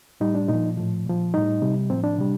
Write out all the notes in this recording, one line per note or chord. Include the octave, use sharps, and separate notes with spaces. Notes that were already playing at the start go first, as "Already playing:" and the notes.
A2 G3 D#4
D4
A#2 F3 D#4
A2 F3
A#2 F3
A2 G3 D#4
C3 G3
A2 F3 C4
D4
C3 G3